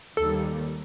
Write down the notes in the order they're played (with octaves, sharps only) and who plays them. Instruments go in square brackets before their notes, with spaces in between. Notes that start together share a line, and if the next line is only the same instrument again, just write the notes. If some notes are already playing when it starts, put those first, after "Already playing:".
[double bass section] D#2 D#3 G3 A#3 [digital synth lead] A4